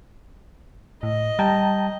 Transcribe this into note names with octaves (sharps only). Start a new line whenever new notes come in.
A2 D#5
G3 G5 A5 A#5